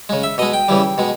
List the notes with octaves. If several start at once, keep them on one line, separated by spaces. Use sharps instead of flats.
C#3 G#3
E5
B2 G#3 D#5
G5
C#3 E3 G3
B2 G#3